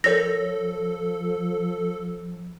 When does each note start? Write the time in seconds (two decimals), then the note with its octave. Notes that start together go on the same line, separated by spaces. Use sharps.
0.04 F3 A4 A#4 C#5 A#6